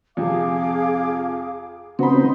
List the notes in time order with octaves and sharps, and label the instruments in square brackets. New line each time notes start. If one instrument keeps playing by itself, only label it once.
[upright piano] F2 C3 [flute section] G#4 F5 D6
[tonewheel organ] C#3 B3 C4 [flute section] D#4 C6 [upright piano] F#4 B5